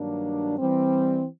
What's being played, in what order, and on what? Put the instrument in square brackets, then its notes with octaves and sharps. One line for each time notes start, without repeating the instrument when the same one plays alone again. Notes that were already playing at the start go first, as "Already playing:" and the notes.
Already playing: [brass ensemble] G2 D#3 F#3 A#3 D4
E3 G3 C4